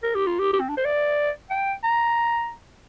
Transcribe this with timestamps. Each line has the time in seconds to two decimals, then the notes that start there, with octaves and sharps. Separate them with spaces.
0.03 A#4
0.15 G4
0.27 F4
0.39 G4
0.53 G4
0.60 C4
0.69 D4
0.77 C5
0.85 D5
1.50 G5
1.83 A#5